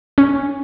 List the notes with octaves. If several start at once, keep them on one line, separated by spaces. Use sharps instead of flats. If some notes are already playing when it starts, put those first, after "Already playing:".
C#4